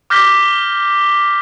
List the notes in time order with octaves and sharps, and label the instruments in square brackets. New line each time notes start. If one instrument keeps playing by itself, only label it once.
[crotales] D6 F6 G6 A#6 B6 G7